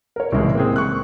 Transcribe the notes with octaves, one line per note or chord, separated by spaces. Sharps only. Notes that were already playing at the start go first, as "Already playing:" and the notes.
A#4 C#5
C2 A2 C#3 E3 G#3
A#3 C4 G#4
C#6 F#6